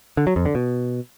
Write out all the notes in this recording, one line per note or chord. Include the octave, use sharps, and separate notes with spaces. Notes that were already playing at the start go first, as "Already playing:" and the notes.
D3
F#3
F2
D3
B2